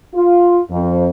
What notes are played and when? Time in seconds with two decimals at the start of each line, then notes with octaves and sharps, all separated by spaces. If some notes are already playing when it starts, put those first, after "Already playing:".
0.14 F4
0.71 F2